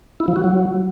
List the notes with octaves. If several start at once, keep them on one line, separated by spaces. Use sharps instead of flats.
E4
F3
F#4
F#3